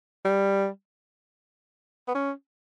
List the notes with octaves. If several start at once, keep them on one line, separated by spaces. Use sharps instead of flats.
G3
B3
C#4